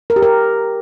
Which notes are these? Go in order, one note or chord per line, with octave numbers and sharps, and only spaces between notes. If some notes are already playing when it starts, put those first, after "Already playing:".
A#4
G4
A#4